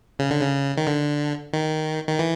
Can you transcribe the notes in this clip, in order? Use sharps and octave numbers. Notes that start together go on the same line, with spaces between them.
C#3
D3
C#3
D#3
D3
D#3
D#3
E3